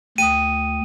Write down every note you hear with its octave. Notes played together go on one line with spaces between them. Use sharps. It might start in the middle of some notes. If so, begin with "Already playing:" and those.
D2 G5 D#6 D#7